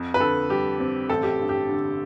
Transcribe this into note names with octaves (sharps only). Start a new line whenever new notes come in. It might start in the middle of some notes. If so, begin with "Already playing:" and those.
Already playing: F2
B4
D3 A4
G3 G4
C4
A1 A4
G4
G2
G4
D3